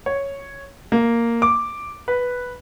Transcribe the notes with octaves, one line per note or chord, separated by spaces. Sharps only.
C#5
A#3
D6
B4